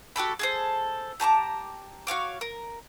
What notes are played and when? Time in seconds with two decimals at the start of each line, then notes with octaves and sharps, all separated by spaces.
0.16 F#4 G4 A4 B5
0.39 G#4 A4 C5
1.20 G4 A5 A#5 D6
2.07 F#4 C#5 F5 D6
2.41 A#4